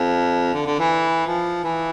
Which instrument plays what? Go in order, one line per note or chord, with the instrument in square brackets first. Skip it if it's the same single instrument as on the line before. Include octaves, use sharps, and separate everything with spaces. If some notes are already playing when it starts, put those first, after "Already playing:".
Already playing: [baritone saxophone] F2
D3
D3
E3
F3
E3